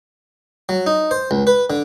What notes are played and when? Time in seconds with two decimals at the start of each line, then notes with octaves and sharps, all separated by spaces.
0.69 F#3
0.86 D#4
1.11 C5
1.31 C#2
1.47 B4
1.70 D3